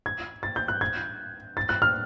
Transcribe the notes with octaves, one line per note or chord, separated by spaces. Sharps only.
G#6
A6
G6
F#6
G#6
A6
F#6
F6